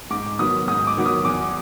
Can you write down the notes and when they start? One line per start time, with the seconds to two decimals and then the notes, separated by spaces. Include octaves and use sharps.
0.10 G#2 D6
0.39 D#3 F#3 B3 D#6
0.68 G#2 D#6
0.87 D6
0.97 D#3 F#3 B3
1.06 D#6
1.25 E2 D6